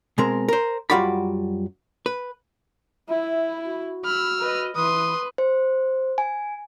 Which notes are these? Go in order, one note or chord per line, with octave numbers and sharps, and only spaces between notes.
B2 G#3 C4 A#4
A#4 C5
F#2 G3 F4 F#4 D5 B5
B4
E4 E5
F#4
B5 E6 F6
B4 D#5
E3 B4 C6 D#6
C5
G#5